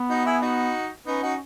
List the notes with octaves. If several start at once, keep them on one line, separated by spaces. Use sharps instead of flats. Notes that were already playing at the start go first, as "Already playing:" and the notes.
Already playing: B3
D#4 F#4
E4 G#4
D#4 F#4
B3 C#4 D#4
D#4 F#4